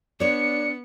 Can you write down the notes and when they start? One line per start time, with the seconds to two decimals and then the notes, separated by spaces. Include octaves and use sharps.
0.20 B3 D4 C#5 D5 C#7